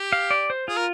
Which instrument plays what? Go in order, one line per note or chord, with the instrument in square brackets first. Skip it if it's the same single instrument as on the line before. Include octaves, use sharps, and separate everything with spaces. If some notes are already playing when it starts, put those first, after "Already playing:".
Already playing: [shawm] G4
[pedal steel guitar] F5
D5
C5
[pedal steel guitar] F4 [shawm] G#4
[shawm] A#4